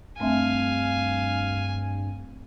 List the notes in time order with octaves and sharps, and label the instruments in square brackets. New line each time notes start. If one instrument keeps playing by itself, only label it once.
[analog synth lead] G2 [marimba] A3 C4 E5 [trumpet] F5 [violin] G#5